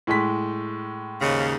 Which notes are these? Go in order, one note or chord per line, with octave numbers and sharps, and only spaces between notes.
A2 G#3 B6
D#2 G#2 C#3